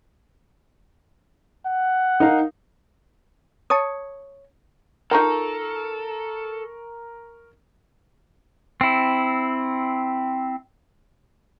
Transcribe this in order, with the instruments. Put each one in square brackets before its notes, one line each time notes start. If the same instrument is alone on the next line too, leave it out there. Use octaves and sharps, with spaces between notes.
[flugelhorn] F#5
[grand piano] D#4 A#4 F5
[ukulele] C#5 [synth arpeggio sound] A5 C#6 D#6
[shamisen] D#4 F4 G5 [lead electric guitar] A4 [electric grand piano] A#4 A#5 C#6
[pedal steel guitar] C4 E4